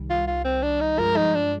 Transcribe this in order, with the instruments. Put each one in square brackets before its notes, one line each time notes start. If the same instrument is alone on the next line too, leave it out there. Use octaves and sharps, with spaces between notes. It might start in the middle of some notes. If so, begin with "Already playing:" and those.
Already playing: [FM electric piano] C2 D#3 G3
[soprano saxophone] F4
F4
C4
D4
D#4
[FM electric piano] G2 F3 G#3 [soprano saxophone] A#4
[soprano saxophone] D#4
D4